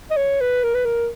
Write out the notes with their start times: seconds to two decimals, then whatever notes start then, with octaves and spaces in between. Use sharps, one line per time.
0.10 D#5
0.16 C#5
0.40 B4
0.63 A#4
0.74 B4
0.85 A#4